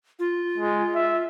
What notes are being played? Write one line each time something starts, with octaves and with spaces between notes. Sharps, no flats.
F4
G#3
E5